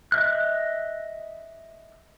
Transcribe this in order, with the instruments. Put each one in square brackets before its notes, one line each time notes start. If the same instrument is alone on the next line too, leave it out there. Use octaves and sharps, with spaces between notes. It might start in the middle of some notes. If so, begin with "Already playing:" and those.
[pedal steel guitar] D#5 E5 F#6